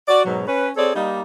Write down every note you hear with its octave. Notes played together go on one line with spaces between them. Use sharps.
F#4 D5
G#2 B2 F#3
C#4 B4
C4 G#4 A4 C#5 D5
G3 A#3 D#4